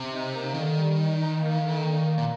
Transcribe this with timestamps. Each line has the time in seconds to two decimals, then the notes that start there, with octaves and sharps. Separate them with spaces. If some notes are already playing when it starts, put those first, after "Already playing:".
Already playing: C3
0.12 D#4
0.32 A#3
0.54 D3 D#3
0.76 G3
0.97 D#4
1.18 D#4
1.40 A#3
1.61 D3
1.82 A#3
2.03 A#3
2.18 A#2